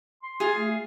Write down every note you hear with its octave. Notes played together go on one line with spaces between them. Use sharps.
C6
F4 G#4
A3